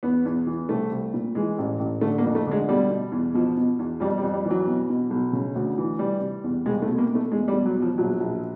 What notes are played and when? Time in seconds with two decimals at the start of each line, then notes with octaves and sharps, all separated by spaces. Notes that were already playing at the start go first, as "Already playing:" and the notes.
0.03 E2 B3
0.25 E2
0.47 E3
0.69 C2 A3
0.91 C2
1.14 A#2
1.35 E3 G#3
1.58 A1
1.79 A1
2.01 D3 A3
2.18 A#3
2.24 F2
2.35 A3
2.47 D3 G#3
2.68 B2 G3
2.90 B2
3.12 E2
3.34 B2 F3
3.57 B2
3.79 E2
4.00 F2 G3
4.18 G3
4.22 F2
4.34 G3
4.45 E3
4.50 F#3
4.67 B2
4.90 B2
5.10 B1
5.33 C#3
5.55 D2
5.78 E3
5.99 C3 G3
6.21 C3
6.44 E2
6.66 C2 G#3
6.82 A3
6.88 B2
6.98 A#3
7.09 B2
7.15 A3
7.32 E2 G#3
7.48 G3
7.53 B2
7.66 F#3
7.76 E2
7.82 F3
7.98 A#1 F#3
8.20 A#1